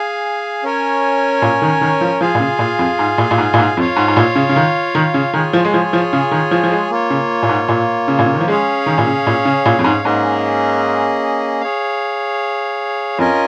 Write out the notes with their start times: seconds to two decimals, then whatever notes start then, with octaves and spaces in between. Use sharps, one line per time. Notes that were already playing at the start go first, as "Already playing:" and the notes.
Already playing: G#4 F5 G#5
0.63 C#4 A#4 C#5 G#5
1.42 A#2
1.62 D#3
1.81 D#3
2.01 F3
2.21 F3 F4 G#4 F5 G#5
2.35 A#2
2.40 C#3
2.59 A#2
2.79 F2
2.99 G#2
3.18 A#2
3.31 A#2
3.38 G#2
3.54 A#2
3.58 G#2
3.77 F2 F4 C#5 F5
3.96 G#2
4.08 G#2
4.17 A#2
4.35 C#3
4.49 C#3
4.56 D#3
4.95 D#3
5.14 C#3
5.34 D#3 F4 G#4 C#5 G#5
5.53 F3
5.65 G#3
5.74 F3
5.93 F3
6.13 C#3
6.31 D#3
6.51 F3
6.64 F3
6.72 G#3
6.90 A#3 F4 C#5
7.10 C#3
7.43 A#2
7.49 G#2
7.69 A#2
8.08 C#3
8.19 A#2
8.26 C#3
8.34 D#3
8.41 F3
8.48 G#3 C#4 G#4 C#5 F5
8.86 D#3
8.98 A#2
9.07 C#3
9.27 A#2
9.45 C#3
9.66 A#2
9.79 F2
9.84 G#2
10.05 G#2 A#3 C#4 G#4 D#5
11.61 G#4 C#5 F5
13.19 F2 C#4 F4 A#4 D#5 G#5